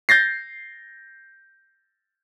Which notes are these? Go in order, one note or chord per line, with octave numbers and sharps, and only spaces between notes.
G6 A6 A#6 C7